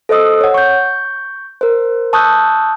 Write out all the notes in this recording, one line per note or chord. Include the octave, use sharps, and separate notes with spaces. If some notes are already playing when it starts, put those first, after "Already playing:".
A4 C5 D#5 D#6 E6
C#5 F#5
C#6 G6
A#4 C5
A5 C#6 D#6 E6 F#6 G6